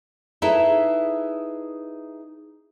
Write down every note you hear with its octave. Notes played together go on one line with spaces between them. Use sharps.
D#4 E4 G#4 A4 B4 E5